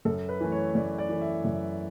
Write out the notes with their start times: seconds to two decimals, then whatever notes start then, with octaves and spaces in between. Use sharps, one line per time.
0.05 F#2 A4
0.29 B4
0.41 E3 A3
0.52 C#5
0.75 F#2 D5
0.98 D5
1.09 E3 A3
1.22 E5
1.45 F#2